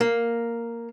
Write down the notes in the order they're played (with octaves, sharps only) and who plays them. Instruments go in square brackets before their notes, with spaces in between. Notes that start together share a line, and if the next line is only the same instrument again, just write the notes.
[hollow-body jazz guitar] A#3